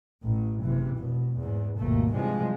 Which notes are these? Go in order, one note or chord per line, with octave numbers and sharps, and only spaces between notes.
A1 A2
F#1 C3 E3
F1 B2
E2 G#2
G#1 D#2 B2 A3 A#3
G2 C3 E3 F3 G3 G#3